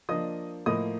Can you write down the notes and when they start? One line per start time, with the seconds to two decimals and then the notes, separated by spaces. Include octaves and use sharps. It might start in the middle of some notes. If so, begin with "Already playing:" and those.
0.09 F3 A#3 D4 D#5 D#6
0.66 A2 F3 A#3 D#5 D#6